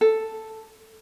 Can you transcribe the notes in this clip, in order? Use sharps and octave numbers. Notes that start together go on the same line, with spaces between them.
A4